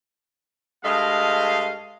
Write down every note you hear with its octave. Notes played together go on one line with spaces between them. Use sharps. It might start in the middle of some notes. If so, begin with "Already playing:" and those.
G2 G#3 A3 D#5 F5